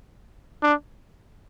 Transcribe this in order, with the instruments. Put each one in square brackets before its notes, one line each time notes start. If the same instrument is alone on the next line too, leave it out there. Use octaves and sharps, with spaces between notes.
[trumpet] D4